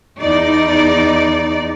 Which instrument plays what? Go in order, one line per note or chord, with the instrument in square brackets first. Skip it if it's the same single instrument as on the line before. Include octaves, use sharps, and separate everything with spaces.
[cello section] E2 D#4 D5